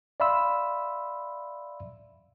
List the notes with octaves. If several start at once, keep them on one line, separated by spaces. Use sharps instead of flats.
D5 E5 F5 B5 C6 E6